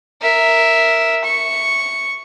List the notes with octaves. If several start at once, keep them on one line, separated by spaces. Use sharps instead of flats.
A#4 E5
C#6